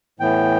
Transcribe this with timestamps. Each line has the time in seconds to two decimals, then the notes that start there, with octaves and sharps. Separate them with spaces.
0.20 A2 E3 B3 G5